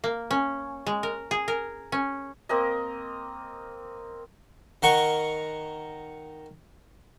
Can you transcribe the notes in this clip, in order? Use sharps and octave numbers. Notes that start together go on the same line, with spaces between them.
A#3
C#4
G#3
A#4
G#4
A#4
C#4
A#3 C4 A#4 D#5
D#3 A#4 F#5 C#6